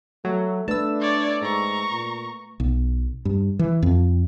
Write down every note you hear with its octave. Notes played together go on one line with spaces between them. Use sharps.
F#3 A3
A3 D4 B4 A5 E6
C#5 D5
G#2 A#5 C#6
A#2
B1
G2
E3
F2